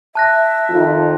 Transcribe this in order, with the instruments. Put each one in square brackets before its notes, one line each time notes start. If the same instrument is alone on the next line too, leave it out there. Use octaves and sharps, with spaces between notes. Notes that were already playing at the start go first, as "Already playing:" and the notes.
[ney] E5 [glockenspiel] A5 F#6 A#6
[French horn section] F2 D#3 F4